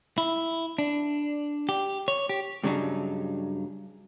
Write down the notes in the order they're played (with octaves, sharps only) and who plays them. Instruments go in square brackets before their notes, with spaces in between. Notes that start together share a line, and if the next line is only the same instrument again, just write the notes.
[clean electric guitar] E4
D4
G4
C#5
G4
[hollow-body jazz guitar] G2 C#3 F#3 D4 D#4